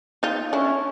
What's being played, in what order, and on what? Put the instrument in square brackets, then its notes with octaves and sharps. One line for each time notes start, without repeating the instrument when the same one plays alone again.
[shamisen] D#4 F4
[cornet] C#4 [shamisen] D4 E4